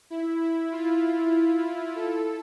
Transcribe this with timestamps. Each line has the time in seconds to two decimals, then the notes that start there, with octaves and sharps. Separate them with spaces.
0.10 E4
0.41 E4
0.72 F4
1.96 A4